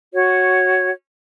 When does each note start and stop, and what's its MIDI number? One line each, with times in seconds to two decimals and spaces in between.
0.14 0.91 66
0.14 0.91 73